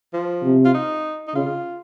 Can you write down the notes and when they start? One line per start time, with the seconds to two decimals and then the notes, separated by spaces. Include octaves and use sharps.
0.13 F3
0.43 C3
0.65 F4
0.74 D#4
1.28 D#4
1.34 C#3 F4